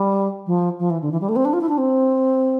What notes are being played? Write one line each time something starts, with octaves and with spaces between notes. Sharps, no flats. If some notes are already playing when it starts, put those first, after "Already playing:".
Already playing: G3
F3
F3
E3
D3
E3
G3
A3
C4
D4
F4
E4
D4
C4